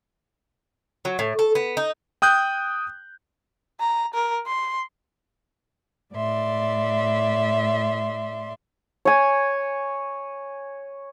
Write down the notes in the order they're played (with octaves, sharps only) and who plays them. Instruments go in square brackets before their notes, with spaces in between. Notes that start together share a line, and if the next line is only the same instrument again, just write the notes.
[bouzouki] F#3
A2
A4
B3
D#4
[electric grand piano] G5 D#6 F#6 G6
[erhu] A#5
A#4
C6
[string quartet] A2 D5 E5 C6
[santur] C#5 G#5